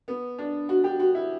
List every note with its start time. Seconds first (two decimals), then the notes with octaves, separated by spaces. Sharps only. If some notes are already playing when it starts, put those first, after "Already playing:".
0.08 B3
0.39 D4
0.69 F#4
0.84 G4
1.00 F#4
1.15 E4